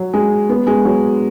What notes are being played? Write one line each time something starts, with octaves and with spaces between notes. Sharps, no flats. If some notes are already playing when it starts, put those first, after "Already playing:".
Already playing: F#3
G#3
B3
G#3
F#3